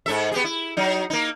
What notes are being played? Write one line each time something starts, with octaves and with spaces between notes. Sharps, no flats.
G#2 A4 E5
B3 G4 G#4
E4
F#3 D#4
A#3 D#4